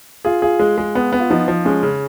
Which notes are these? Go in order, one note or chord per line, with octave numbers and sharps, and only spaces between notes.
F4 G#4
F4 G#4
G#3
G#3
B3
B3
F4
F3 D#4
F3
G#3 C#4
C#3